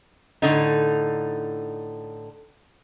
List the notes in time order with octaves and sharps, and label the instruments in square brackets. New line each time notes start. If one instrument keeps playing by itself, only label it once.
[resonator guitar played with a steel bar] A2 D3 D#4